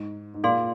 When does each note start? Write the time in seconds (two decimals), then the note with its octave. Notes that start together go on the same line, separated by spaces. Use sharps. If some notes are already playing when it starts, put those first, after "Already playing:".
Already playing: G#2
0.34 G#2
0.44 A#2 G#4 D5 F5 C6